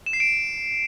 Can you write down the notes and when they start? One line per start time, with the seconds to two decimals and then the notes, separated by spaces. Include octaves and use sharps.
0.06 E7
0.13 C7
0.20 D7